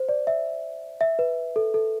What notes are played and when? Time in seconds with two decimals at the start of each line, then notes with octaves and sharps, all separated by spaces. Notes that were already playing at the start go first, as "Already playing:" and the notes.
Already playing: C5
0.09 D5
0.27 E5
1.01 E5
1.19 B4
1.56 A4
1.74 A4